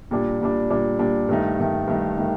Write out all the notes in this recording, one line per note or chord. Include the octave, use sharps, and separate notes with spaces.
A#2 G3 D4
A#2 G3 D4
A#2 G3 D4
A#2 G3 D4
G2 D#3 A3 D#4
G2 D#3 A3 D#4
G2 D#3 A3 D#4
D#3 A3 D#4